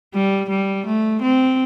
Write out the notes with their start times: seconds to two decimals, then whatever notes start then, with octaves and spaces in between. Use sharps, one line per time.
0.14 G3
0.50 G3
0.86 A3
1.22 C4